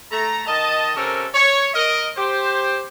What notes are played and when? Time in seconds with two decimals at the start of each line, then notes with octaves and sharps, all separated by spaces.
0.12 A3 A#5
0.47 D#3 D#5 A5
0.96 C3 C4 C#4 A4 A#4
1.34 C#5
1.74 A#4 D#5
2.17 G4 C5